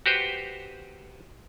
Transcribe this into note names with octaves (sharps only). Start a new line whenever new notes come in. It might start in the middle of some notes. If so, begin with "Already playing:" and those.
F#4 G4 B4 C5